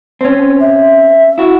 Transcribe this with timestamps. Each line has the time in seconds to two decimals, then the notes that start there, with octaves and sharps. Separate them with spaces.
0.21 C4 C#4
0.60 E5
1.38 E4 F#4